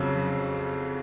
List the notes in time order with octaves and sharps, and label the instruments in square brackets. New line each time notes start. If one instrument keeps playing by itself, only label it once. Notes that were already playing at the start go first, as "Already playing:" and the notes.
Already playing: [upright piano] F2 C#3 F#3